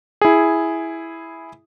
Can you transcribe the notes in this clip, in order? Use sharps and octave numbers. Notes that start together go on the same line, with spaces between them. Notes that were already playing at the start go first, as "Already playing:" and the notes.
E4 G#4